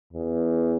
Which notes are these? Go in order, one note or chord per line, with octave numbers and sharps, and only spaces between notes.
E2